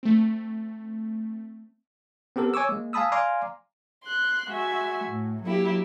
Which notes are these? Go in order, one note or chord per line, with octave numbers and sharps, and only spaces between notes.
A3 C4
B3 C4 G4 A4 A#4
C#5 G#5 C#6 D6 E6
G#3 A#3
F5 G#5 A5 B5 D#6 E6
D5 F5 G#5 A#5 C6 D6
C6 F#6
G#3 F#4 E5 G#5
A2
F#3 A#3 E4 G4